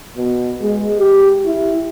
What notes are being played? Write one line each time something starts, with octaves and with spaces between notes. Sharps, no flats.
B2
G#3
G4
E4